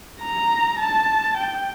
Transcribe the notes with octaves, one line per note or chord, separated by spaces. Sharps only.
A#5
A5
G5